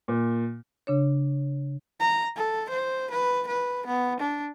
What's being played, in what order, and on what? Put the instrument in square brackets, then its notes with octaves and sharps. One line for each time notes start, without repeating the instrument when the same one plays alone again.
[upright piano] A#2
[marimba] C#3 D4 C#5
[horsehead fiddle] A#5
A4
C5
B4
B4
B3
D4